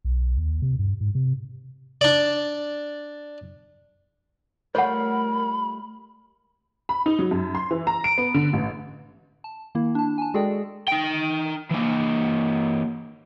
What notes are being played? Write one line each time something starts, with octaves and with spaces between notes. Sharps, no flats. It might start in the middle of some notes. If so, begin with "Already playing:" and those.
B1
D#2
C3
G2
G#2
C3
D4 D5
G3 A3 F4 A#4 C#5 F#5 B5
B5
D#4
F#3
F#2
C6
E3
A#5
D7
B3
D3
A1
A5
D#3 A#3 E4
D4 A5
G#5 A5
G#3 F#4 G#4 A4 D5 G5
D#4 G5
E3 A#3